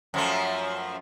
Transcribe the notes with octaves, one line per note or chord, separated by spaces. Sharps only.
F#2 F3 A3